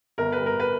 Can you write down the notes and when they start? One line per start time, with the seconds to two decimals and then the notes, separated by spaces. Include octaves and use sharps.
0.18 G1 A#4
0.32 G3 B4
0.46 A#4
0.60 B4